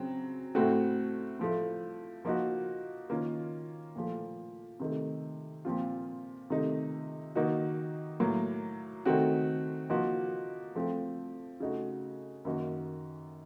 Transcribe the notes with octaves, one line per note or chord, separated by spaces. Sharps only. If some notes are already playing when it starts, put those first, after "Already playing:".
Already playing: C#3 F#3 C4
A2 A3 C4 F#4
A2 F3 A3
F3 A#3 D#4 F#4
D#3 A#3 C#4 F4
A#2 F3 A3
C3 D#3 A3
A#2 F3 C4 F4
C3 D#3 A3 D#4
D#3 A#3 D#4 F#4
A2 F#3 A#3
D#3 A3 C4 F#4
F3 A#3 D#4 F#4
F3 A3 C4
C#3 A3 D#4 F#4
F#2 D#3 A#3 D#4 F#4